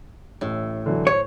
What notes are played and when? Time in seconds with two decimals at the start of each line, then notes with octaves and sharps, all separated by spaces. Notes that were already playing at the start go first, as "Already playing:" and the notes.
0.41 A1 A2
0.86 D3 E3 F#3
1.07 C5 C#5